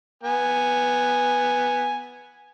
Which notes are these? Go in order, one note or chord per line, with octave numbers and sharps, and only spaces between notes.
B3 G#5